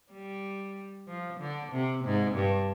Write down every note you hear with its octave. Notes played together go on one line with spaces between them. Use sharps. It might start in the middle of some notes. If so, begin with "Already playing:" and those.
G3
F3
D3
C3
G#2
G2